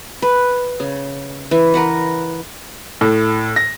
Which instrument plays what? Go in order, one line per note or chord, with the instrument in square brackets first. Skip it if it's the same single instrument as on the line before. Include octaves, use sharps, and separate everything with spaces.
[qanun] B4
C#3
E3
A#4 B4 F#5
[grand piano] A2
A#6